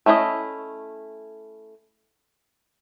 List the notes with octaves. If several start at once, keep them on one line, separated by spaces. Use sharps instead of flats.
A3 C#4 E4 F4 D#5